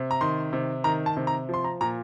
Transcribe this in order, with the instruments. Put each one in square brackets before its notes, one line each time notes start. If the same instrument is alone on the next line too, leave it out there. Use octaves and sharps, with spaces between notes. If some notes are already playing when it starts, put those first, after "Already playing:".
Already playing: [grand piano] C3
A#5
D#3 C6
C3
D#3 A#5
A5
C3
A#5
F3 C6
A#5
A#2 A#5